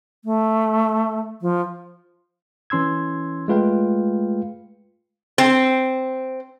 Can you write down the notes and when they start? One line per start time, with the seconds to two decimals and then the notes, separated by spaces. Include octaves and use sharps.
0.25 A3
1.42 F3
2.70 E3 C#4 C6 E6 G#6
3.48 G#3 A3 F4 B4 F5 G5
5.38 C4